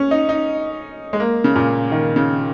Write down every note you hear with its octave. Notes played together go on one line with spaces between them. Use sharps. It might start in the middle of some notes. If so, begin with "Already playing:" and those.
Already playing: C#4
D#4
D#4
G#3
A#3
C#3
A#2
D#3
C#3